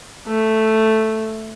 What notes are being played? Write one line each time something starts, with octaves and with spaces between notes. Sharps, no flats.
A3